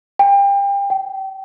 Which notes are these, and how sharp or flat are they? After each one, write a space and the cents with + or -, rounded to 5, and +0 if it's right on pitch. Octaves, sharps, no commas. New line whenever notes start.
G5 +30
G5 -30